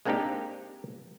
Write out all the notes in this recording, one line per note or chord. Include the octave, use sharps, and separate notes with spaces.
G#3 A#3 C4 D4 D#4 G4